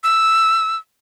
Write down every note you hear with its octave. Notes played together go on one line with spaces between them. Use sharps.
E6